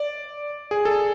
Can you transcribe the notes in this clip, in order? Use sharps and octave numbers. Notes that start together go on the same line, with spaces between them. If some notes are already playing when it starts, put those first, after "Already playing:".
Already playing: D5
G#4
A4